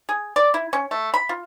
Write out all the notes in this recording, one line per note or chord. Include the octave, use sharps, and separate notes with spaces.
G#4
D5
E4
C#4
A3
B5
F4